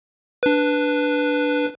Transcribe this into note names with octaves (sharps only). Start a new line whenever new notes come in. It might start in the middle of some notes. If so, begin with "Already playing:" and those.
D4 B4